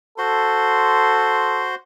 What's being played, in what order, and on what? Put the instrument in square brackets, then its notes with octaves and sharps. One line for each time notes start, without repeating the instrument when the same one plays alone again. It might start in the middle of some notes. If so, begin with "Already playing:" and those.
[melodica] F#4 C5 C6 [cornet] A4